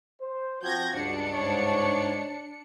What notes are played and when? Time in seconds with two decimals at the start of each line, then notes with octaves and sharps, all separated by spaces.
0.21 C5
0.63 F3 C4 F#4 G6 G#6 A#6
0.94 C#2 G2 D4 C#7
1.32 G#2 C#5